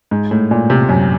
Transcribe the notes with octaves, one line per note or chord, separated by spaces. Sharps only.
G#2
A2
A#2
C3
F#2